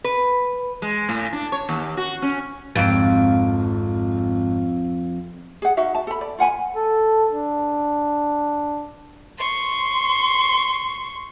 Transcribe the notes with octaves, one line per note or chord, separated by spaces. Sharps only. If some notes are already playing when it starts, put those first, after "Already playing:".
B4
G#3
A2
D4
C#5
D#2
F#4
C#4
G#1 F2 D7
G#4 F#5
D#4 F#4 E5 F5
A5
A4 B5
D5
F4 F#5 G#5 B5
A4
D4
C6 C#6